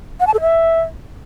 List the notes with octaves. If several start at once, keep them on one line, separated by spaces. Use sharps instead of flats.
F#5
A5
A4
E5